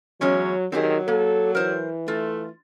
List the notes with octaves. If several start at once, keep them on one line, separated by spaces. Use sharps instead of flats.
E2 F#3 G#3 C#4 C#5
D#3 F#3 C4 G4 G#4
A#3 A4
E3 A#4 C5
A3 F4